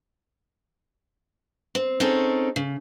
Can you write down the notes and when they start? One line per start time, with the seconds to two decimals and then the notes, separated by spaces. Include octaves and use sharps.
1.75 C4
2.00 C4 C#4 D#4 G#4 A4 C#5
2.56 C#3